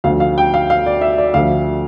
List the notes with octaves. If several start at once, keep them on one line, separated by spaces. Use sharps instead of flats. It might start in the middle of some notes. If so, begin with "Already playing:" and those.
D2 D3 F3 F5
F5
G5
F5
F5
D5
E5
D5
D2 D3 F3 F5